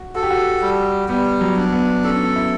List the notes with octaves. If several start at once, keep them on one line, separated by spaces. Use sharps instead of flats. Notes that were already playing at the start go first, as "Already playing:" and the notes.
Already playing: F#4
F#4 A4
G4
F#4
G3
G3 B3
F#3
D4
B3
C#4 A4
E4